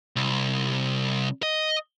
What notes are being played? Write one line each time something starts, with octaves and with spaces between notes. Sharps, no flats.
C2
D#5